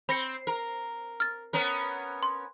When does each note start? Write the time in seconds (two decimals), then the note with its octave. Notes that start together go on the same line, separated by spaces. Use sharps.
0.09 C4 B5 A#6 C#7
0.47 A#4
1.20 F6 A6
1.53 B3 C#4 A#4
2.23 C6